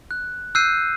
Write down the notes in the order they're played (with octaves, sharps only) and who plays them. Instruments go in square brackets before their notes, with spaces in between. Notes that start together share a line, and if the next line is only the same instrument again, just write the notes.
[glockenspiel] F#6
E6 F#6 G6 C7 D#7